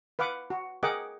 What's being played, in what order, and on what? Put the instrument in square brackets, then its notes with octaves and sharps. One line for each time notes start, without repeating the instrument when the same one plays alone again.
[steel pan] B4 F5 F#5 D6
F#4
G#4 A#4 D#5 F#5 G5 D6